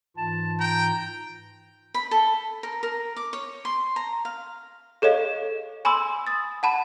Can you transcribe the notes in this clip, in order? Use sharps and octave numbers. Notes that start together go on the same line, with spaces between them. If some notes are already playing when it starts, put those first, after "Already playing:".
G#2 E3 F4 A5
G5 A#5
B5
A4
A#4
A#4
D6
C#5
C6
A#5
F5
G#4 A4 C#5 D#5 F5
G#5 B5 C6 D6 E6
D#6 A6
F#5 A5 B5